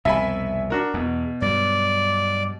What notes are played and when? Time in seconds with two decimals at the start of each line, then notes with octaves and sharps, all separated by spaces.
0.05 C2 F2 B2 E5 G#5 B5
0.70 D4 F#4 A#4
0.94 E2 B2
1.42 G2 F#3 D5